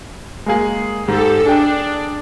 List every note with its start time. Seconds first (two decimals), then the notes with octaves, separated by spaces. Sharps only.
0.46 G#3 A#3 G#4
1.08 G#2 G4 A4
1.45 D4 G#4 G5